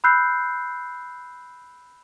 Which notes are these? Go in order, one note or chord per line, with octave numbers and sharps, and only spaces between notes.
B5 E6 F#6 G6 C7